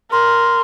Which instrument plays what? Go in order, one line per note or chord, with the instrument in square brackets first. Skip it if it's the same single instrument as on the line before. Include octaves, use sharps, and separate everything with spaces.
[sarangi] A#4 [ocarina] C6